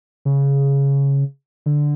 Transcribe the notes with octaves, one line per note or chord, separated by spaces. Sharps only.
C#3
D3